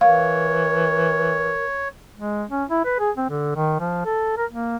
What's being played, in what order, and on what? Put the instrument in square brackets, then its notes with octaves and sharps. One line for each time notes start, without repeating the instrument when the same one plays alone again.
[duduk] E3 [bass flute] A#4 [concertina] C#5 [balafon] F5
[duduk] G#3
C#4
E4
B4
G#4
C4
D3
D#3
F3
A4
A#4
A#3